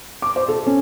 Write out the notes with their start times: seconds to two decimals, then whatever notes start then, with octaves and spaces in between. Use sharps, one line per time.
0.22 D6
0.36 C5
0.48 A4
0.66 C#4